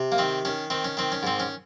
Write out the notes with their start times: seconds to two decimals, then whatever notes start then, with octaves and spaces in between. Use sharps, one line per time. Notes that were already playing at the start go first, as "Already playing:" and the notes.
Already playing: C3
0.12 A#3
0.18 D#3 C4
0.45 D#3 C#4
0.70 D#3 C4
0.84 C#4
0.97 D#3 C4
1.12 C#4
1.23 G#2 C4
1.40 C#4